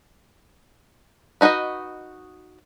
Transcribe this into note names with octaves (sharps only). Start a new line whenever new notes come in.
B3 D#4 F#4 B4 D#5